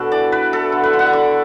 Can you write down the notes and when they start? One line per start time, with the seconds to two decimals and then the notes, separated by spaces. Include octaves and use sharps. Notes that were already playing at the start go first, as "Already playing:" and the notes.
Already playing: B2 D4 F#4 A4 B4
0.12 E3 D5
0.32 E3 B4
0.52 E4 A4
0.72 D3
0.83 B4
0.93 D3
0.99 F#5
1.06 E5
1.13 D4 D5